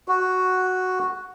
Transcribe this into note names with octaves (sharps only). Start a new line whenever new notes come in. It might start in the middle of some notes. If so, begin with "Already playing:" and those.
F#4